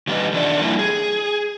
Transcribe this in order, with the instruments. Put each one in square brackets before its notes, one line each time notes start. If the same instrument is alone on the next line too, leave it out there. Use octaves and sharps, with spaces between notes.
[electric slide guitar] D#3 G3 A3 D4 B4 D#5
D#3 F3 D4 D5 E5 F#5
G3 A#3 E4 A#4
G#4